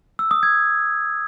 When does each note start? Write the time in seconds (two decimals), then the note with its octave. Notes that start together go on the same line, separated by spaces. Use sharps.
0.19 E6
0.31 D#6
0.43 G#6